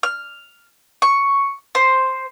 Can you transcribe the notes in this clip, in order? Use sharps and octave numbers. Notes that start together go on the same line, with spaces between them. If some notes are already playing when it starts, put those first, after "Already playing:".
F6
C#6
C5